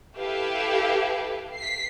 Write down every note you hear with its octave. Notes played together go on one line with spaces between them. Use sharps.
E4 G4 A4 B4 E5 F5
B6 C7